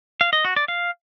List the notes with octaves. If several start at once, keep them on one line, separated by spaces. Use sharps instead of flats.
F5
D#5
F#4
D5
F5